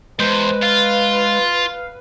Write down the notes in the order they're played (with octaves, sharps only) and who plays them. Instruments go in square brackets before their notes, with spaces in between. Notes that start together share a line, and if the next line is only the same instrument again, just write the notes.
[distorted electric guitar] E2 [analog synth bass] G#3 [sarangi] B4 [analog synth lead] C5
[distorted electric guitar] F4 [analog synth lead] F5